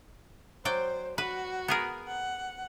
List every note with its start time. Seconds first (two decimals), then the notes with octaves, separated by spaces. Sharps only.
0.65 F#3 C5 D5 G5
1.18 F#4 B4
1.68 B3 G#4 A#4
2.07 F#5